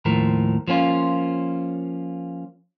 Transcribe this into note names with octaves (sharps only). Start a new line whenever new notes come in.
D#2 A2 F3 A#4
F3 A#3 C#4 F4